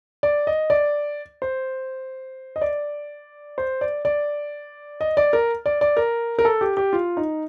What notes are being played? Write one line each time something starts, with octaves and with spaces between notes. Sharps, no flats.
D5
D#5
D5
C5
D#5
D5
C5
D5
D5
D#5
D5
A#4
D5
D5
A#4
A#4
A4
G4
G4
F4
D#4